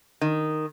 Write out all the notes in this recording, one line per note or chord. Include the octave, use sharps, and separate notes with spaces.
D#3